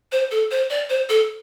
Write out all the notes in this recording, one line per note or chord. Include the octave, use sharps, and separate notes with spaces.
C5
A4
C5
D5
C5
A4